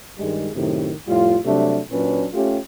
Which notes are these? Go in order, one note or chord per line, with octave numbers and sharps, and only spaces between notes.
G2 D#3 G3 G#3
F#2 A2 C3 D#3
F2 A2 G3 F4
C3 F#3 G3 A3 D4
A#2 F#3 C#4 D4 B4
A3 C#4 F4 G4